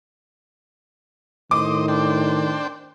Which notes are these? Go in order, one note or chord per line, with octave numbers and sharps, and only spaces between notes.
A2 D#3 C5 D#5 D6
D4 C5 G5